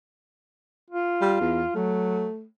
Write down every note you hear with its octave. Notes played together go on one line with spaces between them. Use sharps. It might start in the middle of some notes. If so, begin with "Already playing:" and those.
F4
G3
E2
F#3 A3